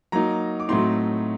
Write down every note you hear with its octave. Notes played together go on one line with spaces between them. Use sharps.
F#3 A#3 D#4 A#5
D6
A2 F#3 A3 C4 D#4 C6